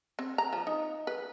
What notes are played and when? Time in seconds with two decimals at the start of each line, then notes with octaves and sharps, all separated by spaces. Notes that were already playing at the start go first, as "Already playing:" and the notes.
0.19 C4
0.38 A#5
0.53 F3
0.67 D#4
1.07 B4